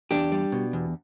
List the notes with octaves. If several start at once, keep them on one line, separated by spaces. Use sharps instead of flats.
E2 D4 G4
G3
B2
E2